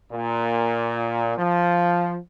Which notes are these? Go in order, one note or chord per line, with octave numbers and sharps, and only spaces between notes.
A#2
F3